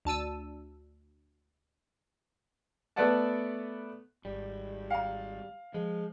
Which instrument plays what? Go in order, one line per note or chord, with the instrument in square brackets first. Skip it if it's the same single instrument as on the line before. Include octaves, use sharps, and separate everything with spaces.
[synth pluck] D2 A5 E6 D#7
[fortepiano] A3 B3 B4 D5 F#5 A5
[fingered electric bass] G#1 [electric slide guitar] G3
[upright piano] F5 [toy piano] G5 A#5
[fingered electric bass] F3 [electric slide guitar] G#3